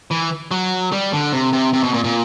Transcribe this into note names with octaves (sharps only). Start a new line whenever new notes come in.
E3
F#3
G3
D3
C3
C3
C3
B2
A#2
A#2